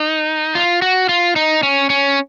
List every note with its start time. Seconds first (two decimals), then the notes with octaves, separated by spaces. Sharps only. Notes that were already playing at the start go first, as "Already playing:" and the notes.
Already playing: D#4
0.55 F4
0.82 F#4
1.09 F4
1.36 D#4
1.63 C#4
1.90 C#4